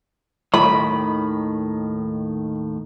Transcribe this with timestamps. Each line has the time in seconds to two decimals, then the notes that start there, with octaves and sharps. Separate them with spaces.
0.54 D#2 A2 D#3 B5